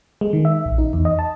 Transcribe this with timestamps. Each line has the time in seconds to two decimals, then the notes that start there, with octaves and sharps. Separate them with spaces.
0.21 G#3
0.33 D#3
0.45 E5
0.66 A#1
0.78 D#4
0.93 E2
1.05 D#5
1.19 A5